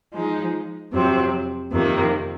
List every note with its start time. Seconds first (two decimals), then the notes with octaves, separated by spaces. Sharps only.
0.13 F3 G#3 D#4
0.92 F2 C3 F#3 C4
1.71 F2 C3 D#3 A#3